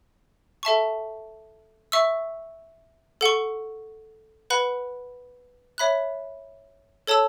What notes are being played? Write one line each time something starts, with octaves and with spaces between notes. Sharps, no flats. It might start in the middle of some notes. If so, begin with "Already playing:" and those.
A4 E5 A5 C#6
E5 C#6 E6
A4 F#5 C#6
B4 F#5 B5 F#6
C#5 E5 B5 F#6
A4 C#5 A5 E6